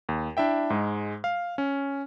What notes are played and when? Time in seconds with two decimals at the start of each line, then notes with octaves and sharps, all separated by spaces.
0.09 D#2
0.37 D4 E4 E5 G5
0.70 G#2 G#3
1.24 F5
1.58 C#4